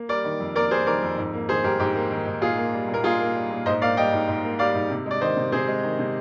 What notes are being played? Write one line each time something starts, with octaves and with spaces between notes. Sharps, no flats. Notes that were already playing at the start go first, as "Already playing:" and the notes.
Already playing: A#3
G3 A#4 D5
D#3
F2
A#3 A#4 D5
G3 G#4 C5
D#3 A#4 D5
F2
G#2
A#3
D#3 G#4 C5
G#2 G4 A#4
G#2 G4
A#3
D#3
G#2
A#2 F4 G#4
A#3
G3
A#2
A#4
A#2 F4 G#4
A#3
G3
A#2
G#2 C5 D#5
A#3 D5 F5
G3 D#5 G5
G#2
G#2
A#3
G3 D5 F5
G#2
C3
G#3 D5
D#3 C5 D#5
C3
C3 G#4 C5
G#3
D#3
C3